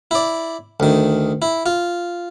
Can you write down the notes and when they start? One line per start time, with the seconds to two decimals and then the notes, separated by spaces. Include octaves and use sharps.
0.11 E4 D5
0.80 D2 D#3
1.42 E4
1.66 F4